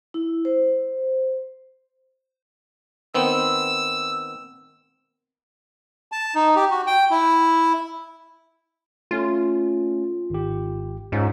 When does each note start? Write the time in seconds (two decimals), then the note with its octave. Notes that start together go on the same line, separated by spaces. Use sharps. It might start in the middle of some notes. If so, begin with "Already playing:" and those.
0.14 E4
0.45 C5
3.14 D#3 B3 C4 E6
6.12 A5
6.35 D#4
6.56 G4
6.71 F#4
6.87 G5
7.11 E4
9.11 A3 C#4 F4
10.30 G#1 G4
11.12 G#2 G#3 C#4 F4